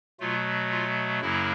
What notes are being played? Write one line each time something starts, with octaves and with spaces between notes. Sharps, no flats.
B2 F#3 A3 F4
F4
F#2 C#3 F#3 A#3 E4